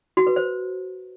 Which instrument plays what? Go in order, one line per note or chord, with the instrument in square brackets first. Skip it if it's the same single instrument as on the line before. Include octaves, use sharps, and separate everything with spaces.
[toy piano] F#4
B4
C5